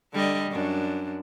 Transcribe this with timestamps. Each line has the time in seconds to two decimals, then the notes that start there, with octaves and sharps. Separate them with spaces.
0.13 D3 G3 D#5
0.51 F#2 D4